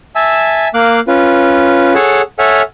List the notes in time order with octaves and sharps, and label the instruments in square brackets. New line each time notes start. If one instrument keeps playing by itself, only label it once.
[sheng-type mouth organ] E5 G#5 A5 E6
A#3 F5 D6 F#6
C#4 F4 B4
G#4 A4 C#5 F#5 A5
A4 C#5 E5 F#5 G#5 F6